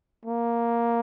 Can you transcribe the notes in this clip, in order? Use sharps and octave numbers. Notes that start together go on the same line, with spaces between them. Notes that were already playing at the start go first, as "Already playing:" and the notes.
A#3